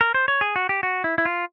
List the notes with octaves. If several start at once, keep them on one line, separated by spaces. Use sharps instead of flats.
A#4
C5
C#5
G#4
F#4
G4
F#4
E4
E4
F4